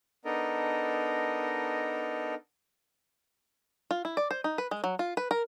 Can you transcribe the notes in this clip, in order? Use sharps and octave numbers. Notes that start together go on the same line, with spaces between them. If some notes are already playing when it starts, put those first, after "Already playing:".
B3 D4 D#4 A4 A#4 D#5
F4
E4
D5
C5
D#4
B4
G#3
F#3
F4
B4
A#4